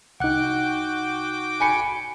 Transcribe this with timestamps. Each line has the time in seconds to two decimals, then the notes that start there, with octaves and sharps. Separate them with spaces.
0.20 C2 D#4 F#4 F#5 G5 D6 F#6
1.60 G#5 B5 C#7